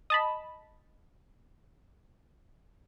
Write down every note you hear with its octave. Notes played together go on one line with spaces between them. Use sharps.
D#5 A5 B5